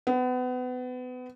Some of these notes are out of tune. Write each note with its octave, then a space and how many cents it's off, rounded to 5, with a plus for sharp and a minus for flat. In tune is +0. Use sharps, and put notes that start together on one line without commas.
B3 +30